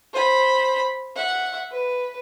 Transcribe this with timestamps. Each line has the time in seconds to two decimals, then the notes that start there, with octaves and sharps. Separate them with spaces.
0.13 C5 B5
1.16 E5 F#5
1.71 B4